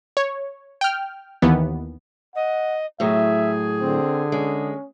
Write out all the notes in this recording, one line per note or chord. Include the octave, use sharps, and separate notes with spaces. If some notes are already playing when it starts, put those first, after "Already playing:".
C#5
G5 F6
D#2 E3 B3
D#5 F#5
A2 F#3 G#4 E5
D3 C4
G#3 C#4